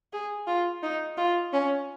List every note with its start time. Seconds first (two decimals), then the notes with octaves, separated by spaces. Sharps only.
0.13 G#4
0.47 F4
0.83 D#4
1.17 F4
1.53 C#4